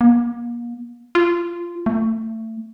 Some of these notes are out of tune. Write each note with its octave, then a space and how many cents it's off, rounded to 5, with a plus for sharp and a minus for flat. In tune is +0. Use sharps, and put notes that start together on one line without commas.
A#3 +35
F4 -15
A3 +25